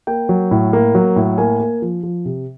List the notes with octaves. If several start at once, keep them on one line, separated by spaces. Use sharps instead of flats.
A#3 G5
F#3
A2
A#3
F#3
A2
A#3 G#5
A#3
F3
F3
C3